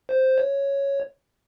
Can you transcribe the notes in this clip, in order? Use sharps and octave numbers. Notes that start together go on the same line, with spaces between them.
C5
C#5